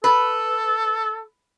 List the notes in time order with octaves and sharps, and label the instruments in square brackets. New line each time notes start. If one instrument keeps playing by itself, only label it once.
[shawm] A4 [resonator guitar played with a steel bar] B4